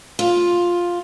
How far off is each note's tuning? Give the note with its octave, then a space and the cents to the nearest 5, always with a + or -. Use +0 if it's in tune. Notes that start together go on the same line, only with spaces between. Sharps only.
F4 +5